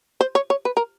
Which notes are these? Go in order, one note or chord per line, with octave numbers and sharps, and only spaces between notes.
C5
C#5
C#5
B4
A#4